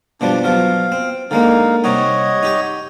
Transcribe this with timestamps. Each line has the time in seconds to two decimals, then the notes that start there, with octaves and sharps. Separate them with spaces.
0.21 B2 F3 G3 D4
0.44 B2 F3 F#3 F5
0.92 C4
1.31 D3 G#3 A#3 D#4 F5
1.84 C3 G3 D#4 C#5 D#5 F#5
2.43 D#4 G4 G5